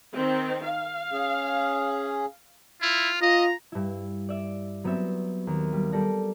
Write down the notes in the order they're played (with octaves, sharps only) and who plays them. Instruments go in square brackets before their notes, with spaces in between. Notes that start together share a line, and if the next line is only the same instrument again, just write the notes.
[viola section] D#3 C4
F5
[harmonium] C#4 G#4
[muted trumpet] E4 [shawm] F4
[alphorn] F4 [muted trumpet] D#5 [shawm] A#5
[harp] G2 E4
D5 E5
F#3 B3 C4 C#5 E5
D#2
G3
G3 A4 D5 A#6